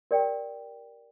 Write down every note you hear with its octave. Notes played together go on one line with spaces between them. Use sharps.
G4 A#4 D5 G5